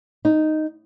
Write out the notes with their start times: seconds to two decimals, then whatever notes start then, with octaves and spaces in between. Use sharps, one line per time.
0.25 D#4